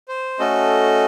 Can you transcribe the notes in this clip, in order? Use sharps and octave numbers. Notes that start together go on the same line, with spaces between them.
C5
A3 C#4 F#4 A4 D#5